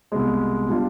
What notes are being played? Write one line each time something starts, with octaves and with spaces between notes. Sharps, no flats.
C2 B2 G#3
B2 G3 D4 F4